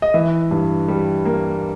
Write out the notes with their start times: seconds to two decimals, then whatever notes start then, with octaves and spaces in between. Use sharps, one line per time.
0.02 D#5
0.14 E3 E5
0.51 G2
0.88 G3
1.25 A#3